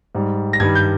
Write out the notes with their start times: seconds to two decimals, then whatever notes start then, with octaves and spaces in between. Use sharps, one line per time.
0.15 G#2 G3
0.53 A#6
0.60 G2 D#3 G3 G#6
0.75 G6